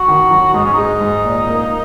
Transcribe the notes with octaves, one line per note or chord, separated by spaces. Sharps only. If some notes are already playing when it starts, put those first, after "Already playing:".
Already playing: F#4
D#3
F#3
G#2 D#4
C#4
G#3 D#4
G#2
A#2
A#3